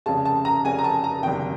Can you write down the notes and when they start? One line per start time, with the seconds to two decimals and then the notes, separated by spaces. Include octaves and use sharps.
0.06 F1 F2 C#3 A5
0.25 A5
0.45 A#5
0.65 F1 F2 C#3 G#5
0.79 A#5
0.84 A5
1.04 A#5
1.23 F#1 E2 C3 D#3 G5